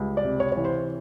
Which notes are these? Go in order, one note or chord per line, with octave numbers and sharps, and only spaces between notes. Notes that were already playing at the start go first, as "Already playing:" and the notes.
Already playing: C#2 G3
D5
C3
C#5
E3 C#5
C5